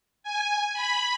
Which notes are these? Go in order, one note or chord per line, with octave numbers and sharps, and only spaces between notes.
G#5
B5